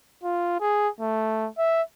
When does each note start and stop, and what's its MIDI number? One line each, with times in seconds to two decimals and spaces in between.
0.23 0.56 65
0.60 0.89 68
1.01 1.48 57
1.58 1.82 76